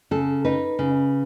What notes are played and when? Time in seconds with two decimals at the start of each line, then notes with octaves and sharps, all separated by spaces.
0.11 C#3 A4
0.45 D#4 B4
0.79 C#3